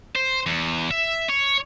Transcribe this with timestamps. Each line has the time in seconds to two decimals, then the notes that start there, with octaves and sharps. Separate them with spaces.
0.15 C5
0.46 E2
0.91 E5
1.29 C#5